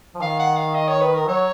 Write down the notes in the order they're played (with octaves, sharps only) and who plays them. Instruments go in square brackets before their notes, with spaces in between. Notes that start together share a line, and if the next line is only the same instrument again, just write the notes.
[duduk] F3
[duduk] D#3 [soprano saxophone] F5
[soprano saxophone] F#5
F5
D#5
C#5
B4
A#4
[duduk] F#3 [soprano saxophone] C#5